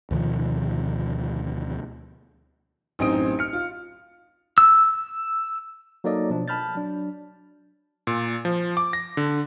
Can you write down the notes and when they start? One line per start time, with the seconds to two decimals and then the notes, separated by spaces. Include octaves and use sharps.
0.11 D2 B2 D#3 F3
2.99 A1 F#2 C4 D#4 D#6 D7
3.39 F6 C#7
3.53 F4
4.58 E6
6.04 F#3 A#3 D#4 A4 D5 D#5
6.30 B2 F3 D4
6.48 A5 B5 F6 G6 A6
6.75 F#3 D4
8.07 A#2
8.45 F3
8.77 D6
8.93 A#6
9.17 D3